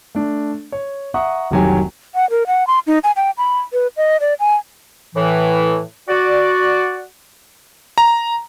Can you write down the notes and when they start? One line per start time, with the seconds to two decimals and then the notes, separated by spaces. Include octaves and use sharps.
0.15 A3 D4
0.72 C#5
1.14 E5 F#5 A#5 C#6 D#6
1.51 F1 C2 D#3 F#3 G4 G#5
2.15 F#5
2.30 A#4
2.47 F#5
2.67 C6
2.87 D#4
3.04 G#5
3.16 G5
3.38 B5
3.73 B4
3.97 D#5
4.20 D5
4.40 G#5
5.15 A2 E3
6.09 F#4 D5
7.98 A#5